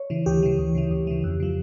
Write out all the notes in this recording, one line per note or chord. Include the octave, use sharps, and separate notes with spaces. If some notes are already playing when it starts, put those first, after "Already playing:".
Already playing: C#5
C#3 E3
D2 G4
C#3 E3
D2
C#3 E3
D2
C#3 E3
F2
C#3 F3